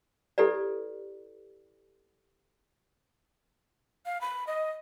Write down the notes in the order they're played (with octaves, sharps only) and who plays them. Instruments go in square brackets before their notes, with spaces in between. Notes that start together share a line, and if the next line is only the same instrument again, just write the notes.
[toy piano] E4 G4 A4 B4 D5
[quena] F5
B5
D#5